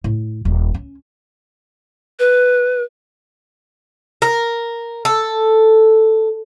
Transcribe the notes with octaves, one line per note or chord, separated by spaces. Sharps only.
A2
D#1
C#4
B4
A#4
A4